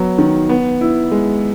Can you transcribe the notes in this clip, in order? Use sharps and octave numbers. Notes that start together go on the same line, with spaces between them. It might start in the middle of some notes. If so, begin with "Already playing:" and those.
Already playing: F#3 B3
D#3
B3
E4
G#3